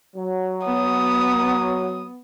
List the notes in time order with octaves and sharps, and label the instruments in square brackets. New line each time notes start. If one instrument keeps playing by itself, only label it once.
[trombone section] F#3
[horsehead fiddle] B3 [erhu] D#6